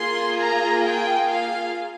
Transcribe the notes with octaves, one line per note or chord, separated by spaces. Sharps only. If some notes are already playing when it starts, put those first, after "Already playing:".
Already playing: A#3 F4 G#4 C6
A#5
G5
F5